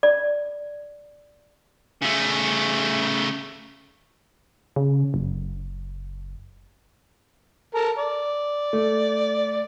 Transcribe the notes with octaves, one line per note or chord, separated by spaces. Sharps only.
D5
C#3 A3
C#3
F#1
A4 A#4
D5
A3